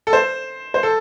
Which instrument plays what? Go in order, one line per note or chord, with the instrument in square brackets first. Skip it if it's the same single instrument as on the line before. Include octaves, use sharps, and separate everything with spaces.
[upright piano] A4
C5
C5
A4